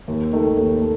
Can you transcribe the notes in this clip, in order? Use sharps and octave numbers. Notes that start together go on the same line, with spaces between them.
D#2
D#3 A3
D#2
A3